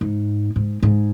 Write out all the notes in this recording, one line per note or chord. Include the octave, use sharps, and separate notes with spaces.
G#2
G#2
G#2